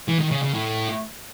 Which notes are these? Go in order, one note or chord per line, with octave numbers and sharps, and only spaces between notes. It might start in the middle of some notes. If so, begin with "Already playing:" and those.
E3
D#3
C#3
C#3
A2